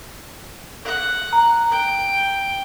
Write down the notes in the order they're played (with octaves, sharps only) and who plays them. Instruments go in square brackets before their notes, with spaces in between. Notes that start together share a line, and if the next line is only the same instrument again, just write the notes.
[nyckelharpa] F#5
[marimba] A#5
[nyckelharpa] G5